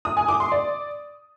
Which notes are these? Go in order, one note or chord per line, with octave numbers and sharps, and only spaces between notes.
D#6
G#5
D6
C6
D5